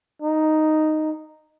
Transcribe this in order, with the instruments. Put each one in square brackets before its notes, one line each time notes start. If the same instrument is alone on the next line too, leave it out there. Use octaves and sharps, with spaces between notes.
[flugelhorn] D#4